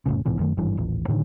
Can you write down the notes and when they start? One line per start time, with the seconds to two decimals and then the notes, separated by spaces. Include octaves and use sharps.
0.06 F1 B1 A2 C#3
0.26 A#1 G#2 B2 E3
0.39 F#2 D#3 A3
0.57 G#1 G2 E3
0.77 D#1 A1
1.08 A2 D3 D#3